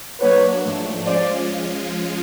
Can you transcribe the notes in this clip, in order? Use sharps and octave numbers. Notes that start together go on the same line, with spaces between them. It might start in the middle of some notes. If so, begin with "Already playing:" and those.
F#3 A#3 D4 F#4 B4 C#5
G#2 F3 A3 D4
F3 G#3 C#4 F4 C5 D5